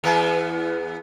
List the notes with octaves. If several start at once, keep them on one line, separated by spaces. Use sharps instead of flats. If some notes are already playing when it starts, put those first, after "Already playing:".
E2 B3